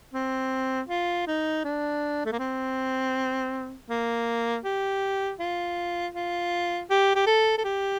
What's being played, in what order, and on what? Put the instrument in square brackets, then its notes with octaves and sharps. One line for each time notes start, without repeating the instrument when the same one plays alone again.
[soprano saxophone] C4
F4
D#4
D4
A3
A#3
C4
A#3
G4
F4
F4
G4
G4
A4
A4
G4